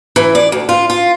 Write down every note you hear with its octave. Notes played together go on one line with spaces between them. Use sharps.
E3
D5
D2
F4
F4